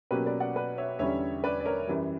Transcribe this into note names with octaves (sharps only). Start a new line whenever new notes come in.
B2 F#3 A#3 C#4 G4 B4
B4 D5
D5 F#5
B4 D5
C#5 E5
E2 D3 G3 C#4 C#5 E5
B4 D5
D5
A#4 C#5
F#2 E3 G3